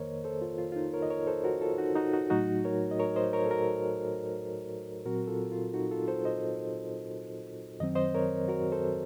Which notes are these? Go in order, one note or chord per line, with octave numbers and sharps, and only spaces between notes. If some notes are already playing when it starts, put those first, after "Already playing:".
Already playing: F2 D#3 A#3 A#4 C5 C#5 D#5
A4 C5
F4
F4
F4
D#4
A#4 C#5
D#5
A#4 C#5
A4 C5
F#4 A#4
F4 A4
D#4 F#4
D#4 F#4
D#4 F#4
A2 F#3 A3 D#4 F#4
A#4 C#5
D#5
A#4 C#5
C5 D#5
A#4 C#5
A4
F#4 A#4
A#2 F#3 C4 F#4 A#4
F4 A4
F4
D#4 F#4
F4 A4
A4 C5
C5 D#5
F#2 D#3 F#3 C4 D#5
C5 D#5
A#4 C#5
F#4 A#4
A4 C5